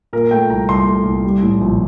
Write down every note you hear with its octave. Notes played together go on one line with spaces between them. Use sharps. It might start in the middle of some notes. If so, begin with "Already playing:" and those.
A#2 A#4
A3 G5
C2 A#5
C2 C6
A3
C2
G3
A2
A#1